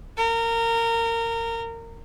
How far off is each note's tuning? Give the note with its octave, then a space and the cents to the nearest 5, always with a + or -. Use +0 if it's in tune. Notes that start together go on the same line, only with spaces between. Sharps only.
A#4 -20